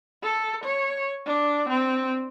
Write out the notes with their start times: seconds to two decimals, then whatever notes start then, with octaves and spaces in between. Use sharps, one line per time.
0.24 A4
0.64 C#5
1.27 D4
1.69 C4